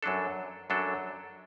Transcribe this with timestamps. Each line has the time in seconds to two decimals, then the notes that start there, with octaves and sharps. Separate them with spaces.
0.03 F#2 F#3 D4 A4
0.70 F#2 F#3 D4 A4